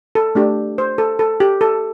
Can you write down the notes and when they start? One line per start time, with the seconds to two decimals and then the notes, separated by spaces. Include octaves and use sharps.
0.15 A4
0.35 A3 D4 G4
0.78 C5
0.98 A4
1.19 A4
1.40 G4
1.61 A4